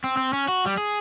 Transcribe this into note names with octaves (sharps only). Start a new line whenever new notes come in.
C4
C4
C#4
F#4
G3
G#4